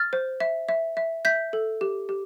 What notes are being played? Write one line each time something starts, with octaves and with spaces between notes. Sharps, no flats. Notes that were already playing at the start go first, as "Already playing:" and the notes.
Already playing: F6 A6
C5
E5
E5
E5
E5 G6 B6
A4
G4
G4